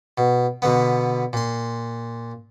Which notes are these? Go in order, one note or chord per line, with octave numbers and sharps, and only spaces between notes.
B2
B2 D3 B3
A#2 C6